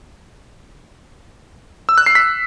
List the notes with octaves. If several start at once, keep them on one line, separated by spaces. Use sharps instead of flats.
E6
F#6
C7
B6